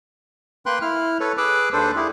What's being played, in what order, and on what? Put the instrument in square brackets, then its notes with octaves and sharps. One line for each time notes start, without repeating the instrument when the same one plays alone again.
[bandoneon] A#3 B4 G5 C6 F#6
E4 F6
A4 B4 C#5
G#4 B4 D6 E6 F#6
D#2 D4 A4 B4 C5
E4 G4 G#4